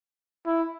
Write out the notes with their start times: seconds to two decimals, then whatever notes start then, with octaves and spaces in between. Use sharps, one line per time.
0.46 E4